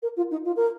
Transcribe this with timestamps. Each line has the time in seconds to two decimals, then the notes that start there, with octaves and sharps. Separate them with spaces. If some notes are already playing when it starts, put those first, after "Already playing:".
0.02 A#4
0.16 F4
0.31 D#4
0.45 F4
0.56 A#4